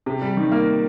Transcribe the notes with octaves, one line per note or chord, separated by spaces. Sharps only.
C3
G3
D#3
A#3